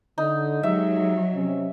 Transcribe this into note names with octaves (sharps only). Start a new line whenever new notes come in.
D3 D#4
F#3 G#3 D#4 G4 E5
C3 C#4